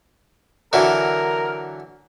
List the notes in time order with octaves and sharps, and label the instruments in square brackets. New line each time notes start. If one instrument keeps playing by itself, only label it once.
[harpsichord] D3 E3 F#3 [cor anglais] A#4